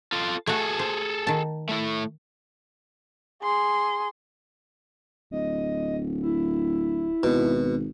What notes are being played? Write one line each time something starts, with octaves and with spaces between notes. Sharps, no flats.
F4 A4
A3 F#4 G#4 A4
C5
D#3 A5
A3 E4
G#4 C6
D1 D#5
E4
G#1 B2